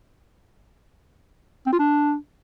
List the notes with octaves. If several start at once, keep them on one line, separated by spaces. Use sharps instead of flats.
C4
F4
D4